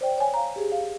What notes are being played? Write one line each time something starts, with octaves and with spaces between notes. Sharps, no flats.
C5 D5 G5
C#5 G#5
F5 A#5
G4 G#4
F5